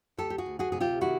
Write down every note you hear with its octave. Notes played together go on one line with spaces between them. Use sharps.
D2 G4 A4
G4
F#4 G#4
D2
F#4 G#4
C3 G#4
F4 G4
D#3 E4 F#4